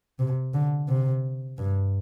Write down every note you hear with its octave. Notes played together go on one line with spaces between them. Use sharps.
C3
D3
C3
G2